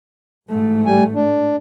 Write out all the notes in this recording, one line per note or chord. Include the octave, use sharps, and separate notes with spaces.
A1 G#2 A3
G3 G#5
D4